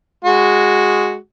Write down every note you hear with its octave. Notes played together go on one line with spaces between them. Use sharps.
G#3 F#4